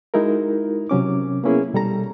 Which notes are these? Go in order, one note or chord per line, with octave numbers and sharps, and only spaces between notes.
G#3 D#4 E4 F#4 A#4
C3 F#3 C#4 D6
A#3 B3 C#4 E4 G#4
B2 G3 A4 A#5